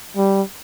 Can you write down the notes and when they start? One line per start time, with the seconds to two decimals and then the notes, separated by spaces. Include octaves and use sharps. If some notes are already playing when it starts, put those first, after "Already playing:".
0.17 G3